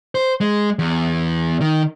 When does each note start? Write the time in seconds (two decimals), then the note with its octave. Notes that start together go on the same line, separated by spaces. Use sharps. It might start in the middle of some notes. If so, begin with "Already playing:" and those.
0.15 C5
0.40 G#3
0.79 E2
1.61 D#3